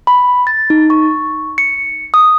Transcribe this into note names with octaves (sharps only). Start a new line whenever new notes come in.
B5
A6
D#4
C#6
C#7
D#6